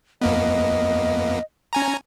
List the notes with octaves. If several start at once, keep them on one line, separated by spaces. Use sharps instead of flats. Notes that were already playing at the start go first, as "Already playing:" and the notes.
F2 A#3 B3 D#5
C#4 G#5 A#5